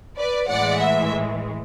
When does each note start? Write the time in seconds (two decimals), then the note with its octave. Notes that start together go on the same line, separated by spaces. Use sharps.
0.18 B4 D5
0.49 A2 E3 G#3 D5 F#5
0.81 E5